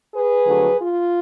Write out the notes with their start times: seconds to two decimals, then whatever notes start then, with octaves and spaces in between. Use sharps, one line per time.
0.14 G#4 B4
0.47 F2 D3 F#3 A3
0.79 F4